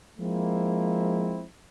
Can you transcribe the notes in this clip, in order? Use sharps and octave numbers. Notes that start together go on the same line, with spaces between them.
F3 G#3 A#3 C4 E4